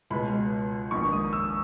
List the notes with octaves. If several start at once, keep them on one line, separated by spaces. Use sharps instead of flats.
C#2 B2 G#3 B5
A#1 G#2 D#3 C#6
D#6
E6